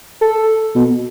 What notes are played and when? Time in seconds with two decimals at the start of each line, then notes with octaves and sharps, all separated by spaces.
0.21 A4
0.75 B2